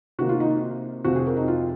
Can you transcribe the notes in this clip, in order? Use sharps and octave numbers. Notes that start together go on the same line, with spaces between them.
C3 D#3 A#3 F#4
F4
D#4
F2 C3 F3 C4 F#4
G#4
A#4
D#4
F4